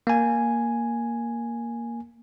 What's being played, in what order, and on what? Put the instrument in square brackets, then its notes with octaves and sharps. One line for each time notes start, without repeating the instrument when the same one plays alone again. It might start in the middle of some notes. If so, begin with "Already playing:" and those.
[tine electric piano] A#3 G#5